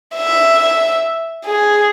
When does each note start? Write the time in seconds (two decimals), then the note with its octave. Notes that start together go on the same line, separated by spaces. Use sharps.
0.16 E5
1.45 G#4